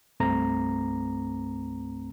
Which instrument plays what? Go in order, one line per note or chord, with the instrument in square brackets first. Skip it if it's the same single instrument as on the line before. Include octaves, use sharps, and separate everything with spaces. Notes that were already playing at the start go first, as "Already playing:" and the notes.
[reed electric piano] C2 G2 A3 C4 A#5